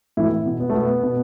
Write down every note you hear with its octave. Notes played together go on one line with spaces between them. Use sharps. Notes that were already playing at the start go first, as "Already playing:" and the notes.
A2 E3 E4
B2
B3
A3
B2 B3
B2